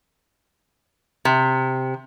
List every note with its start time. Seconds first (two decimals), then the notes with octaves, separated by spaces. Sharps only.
1.25 C3